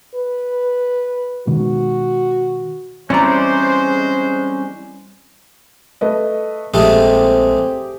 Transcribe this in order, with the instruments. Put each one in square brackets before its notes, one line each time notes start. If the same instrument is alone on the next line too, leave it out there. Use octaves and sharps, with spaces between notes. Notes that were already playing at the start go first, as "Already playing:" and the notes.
[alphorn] B4
[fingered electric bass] B2 D#3 G#3 [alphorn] F#4
[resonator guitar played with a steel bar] E3 A#5 [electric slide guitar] G3 C4 [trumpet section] G#3 C5 [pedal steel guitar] C#4 D5
[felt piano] A3 B4 D#5
[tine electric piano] A#1 [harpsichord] G#3 A3 [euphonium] C4 [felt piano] G4 G#4